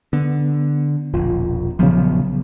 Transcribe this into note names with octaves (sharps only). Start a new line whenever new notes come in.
D3 B3
E1 A#1 F4
A#1 C#3 F3 F#3 B3